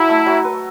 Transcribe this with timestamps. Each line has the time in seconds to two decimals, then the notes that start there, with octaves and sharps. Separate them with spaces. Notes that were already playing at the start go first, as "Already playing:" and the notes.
Already playing: F#3 E4 E5
0.09 A3
0.26 F#3
0.44 B4